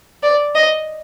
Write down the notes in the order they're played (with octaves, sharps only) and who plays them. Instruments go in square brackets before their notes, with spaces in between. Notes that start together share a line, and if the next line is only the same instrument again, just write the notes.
[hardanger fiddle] D5
D#5